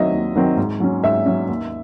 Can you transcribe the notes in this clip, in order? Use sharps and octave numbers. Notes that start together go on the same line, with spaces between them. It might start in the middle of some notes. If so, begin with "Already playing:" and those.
Already playing: D#2 D#3 F#3 C4 D#5 E5
D#2
D#3 F#3 C4
G#2
F#3 C#4
G#2 E5
F#3 C#4
D#2